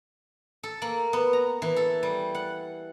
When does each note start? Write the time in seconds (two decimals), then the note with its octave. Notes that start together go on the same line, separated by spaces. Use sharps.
0.63 A4
0.82 A#3
1.13 B3
1.33 A#5
1.62 E3
1.76 A4
2.03 G3
2.35 F#5